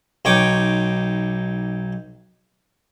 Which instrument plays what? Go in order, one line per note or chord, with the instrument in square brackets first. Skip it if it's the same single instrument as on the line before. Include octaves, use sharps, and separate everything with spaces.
[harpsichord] B1 D#4 C#5 G5 D6